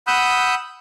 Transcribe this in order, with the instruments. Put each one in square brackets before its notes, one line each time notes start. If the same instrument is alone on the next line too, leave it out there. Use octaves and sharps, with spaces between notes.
[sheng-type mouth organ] F#5 B5 D#6 E6 F#6 G6